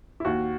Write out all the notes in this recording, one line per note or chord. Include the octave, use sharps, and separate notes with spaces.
E4
D#2 F#4